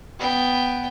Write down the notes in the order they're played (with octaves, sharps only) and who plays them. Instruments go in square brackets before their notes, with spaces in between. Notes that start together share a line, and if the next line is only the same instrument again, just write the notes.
[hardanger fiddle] B3 G5